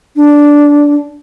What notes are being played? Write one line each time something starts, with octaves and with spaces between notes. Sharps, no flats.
D4